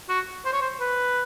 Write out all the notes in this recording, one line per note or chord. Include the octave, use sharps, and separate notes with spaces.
F#4
C5
C#5
C5
B4